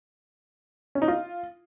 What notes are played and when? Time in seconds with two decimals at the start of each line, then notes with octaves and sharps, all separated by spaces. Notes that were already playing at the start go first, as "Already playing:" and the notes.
0.95 C#4
1.02 D#4
1.08 F4